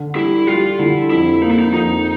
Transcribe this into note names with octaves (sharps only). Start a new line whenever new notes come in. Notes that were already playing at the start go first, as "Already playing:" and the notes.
Already playing: D3
G3 E4
G3 F4
D3 E4
F2 E4
A#3 D#4
E4
D#4
F2 D#4